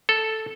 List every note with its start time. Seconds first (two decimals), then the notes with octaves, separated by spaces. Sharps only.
0.09 A4